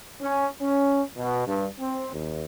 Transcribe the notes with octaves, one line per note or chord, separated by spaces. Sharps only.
C#4
C#4
B2
G2
C4
D#2